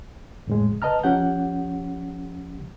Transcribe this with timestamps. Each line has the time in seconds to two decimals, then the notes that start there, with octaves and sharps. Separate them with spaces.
0.47 F2 A2 G#3
0.82 B4 D#5 A5 A#5 F6
1.03 F3 C#4 G4 F#5 G6